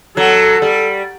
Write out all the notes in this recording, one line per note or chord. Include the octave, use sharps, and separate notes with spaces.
F#3 A4
G3